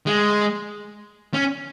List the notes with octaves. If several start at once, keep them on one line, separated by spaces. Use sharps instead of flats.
G#3
C#4